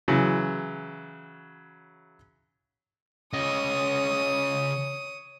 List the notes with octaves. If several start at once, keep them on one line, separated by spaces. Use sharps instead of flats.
C#3 E3 F#3
C#3 C#5 D#5 D#6